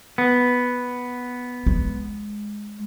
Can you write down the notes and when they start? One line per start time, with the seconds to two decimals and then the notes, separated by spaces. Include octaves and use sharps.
0.18 B3
1.66 G#3